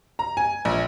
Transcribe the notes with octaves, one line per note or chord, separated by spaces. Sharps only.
A#5
G#5
A#1